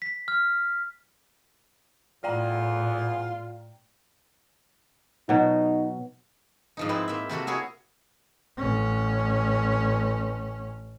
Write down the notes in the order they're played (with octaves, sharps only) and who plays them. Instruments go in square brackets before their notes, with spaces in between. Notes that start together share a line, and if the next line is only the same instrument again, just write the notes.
[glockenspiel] B6
F6
[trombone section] E2 [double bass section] A2 [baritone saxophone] F4 [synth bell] D5 G5 A#5
[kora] B2 F#3 [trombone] D#4
[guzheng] G#2 F3 D#4
C4 E4 B4
A#3 E5
C3 A#3 F#4 A4
E4 F#4 G#4 C#5
[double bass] A1 C#4